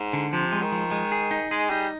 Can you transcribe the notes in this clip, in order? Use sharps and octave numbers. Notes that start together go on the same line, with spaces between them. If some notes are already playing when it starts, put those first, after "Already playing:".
Already playing: G#2
D3
C3 F3
G#3
D#3
F3
G#3
G#4
D#4
G#3 G#4
G3 D#4